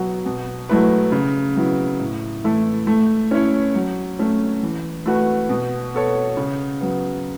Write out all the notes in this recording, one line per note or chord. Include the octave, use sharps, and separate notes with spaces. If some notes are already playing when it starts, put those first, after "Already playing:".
Already playing: B2 F#3 B3 F#4
B2
F#3 A3 E4 B4
C#3
F#3 B3 E4
A2
E3 A3 E4 A4
A3
C#4 E4 C#5
F#3
A3 C#4
E3
A3 F#4 B4
B2
B3 A4 C#5
C#3
F#3 B3